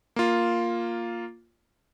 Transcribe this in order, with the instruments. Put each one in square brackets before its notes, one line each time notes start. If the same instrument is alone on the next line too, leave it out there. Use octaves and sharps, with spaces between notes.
[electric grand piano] A#3 F4